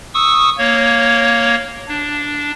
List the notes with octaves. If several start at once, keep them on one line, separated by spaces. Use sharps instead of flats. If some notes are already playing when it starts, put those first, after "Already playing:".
C#6 D#6 E6
A#3 C#5
D4